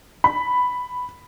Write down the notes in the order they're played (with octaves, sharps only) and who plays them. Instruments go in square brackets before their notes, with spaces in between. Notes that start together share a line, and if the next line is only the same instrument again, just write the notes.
[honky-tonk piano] B5